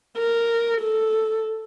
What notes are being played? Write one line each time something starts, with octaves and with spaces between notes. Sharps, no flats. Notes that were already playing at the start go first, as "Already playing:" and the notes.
A#4
A4